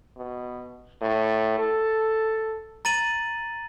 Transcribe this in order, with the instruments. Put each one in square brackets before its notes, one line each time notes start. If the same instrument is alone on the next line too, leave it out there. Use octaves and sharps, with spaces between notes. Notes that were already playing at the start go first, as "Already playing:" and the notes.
[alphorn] B2
A2
A4
[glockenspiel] A#5 A6 D#7 F#7